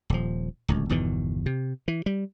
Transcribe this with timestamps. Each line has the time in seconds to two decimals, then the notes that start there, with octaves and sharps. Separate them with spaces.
0.10 D#1 F3
0.68 D1 C#2
0.89 G1 E2 B2 D#3
1.46 C3
1.88 E3
2.06 G3